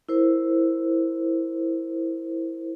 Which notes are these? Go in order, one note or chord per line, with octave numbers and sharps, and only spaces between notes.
E4 A#4 C5